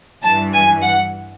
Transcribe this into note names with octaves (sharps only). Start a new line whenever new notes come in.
G2 E3 A5
G#5
F#5